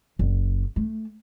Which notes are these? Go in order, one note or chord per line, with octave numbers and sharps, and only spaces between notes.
F#1
A3